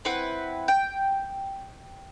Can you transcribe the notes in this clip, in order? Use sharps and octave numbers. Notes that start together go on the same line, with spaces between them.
C4 E4 B4 F#5
G5